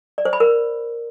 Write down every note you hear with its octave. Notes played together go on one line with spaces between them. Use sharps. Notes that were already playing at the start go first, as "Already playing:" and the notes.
D5
C5
B5
A#4